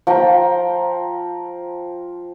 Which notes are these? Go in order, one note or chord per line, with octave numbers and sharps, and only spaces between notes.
F3 G5 A#5